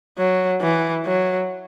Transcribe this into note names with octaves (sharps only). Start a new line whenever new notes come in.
F#3
E3
F#3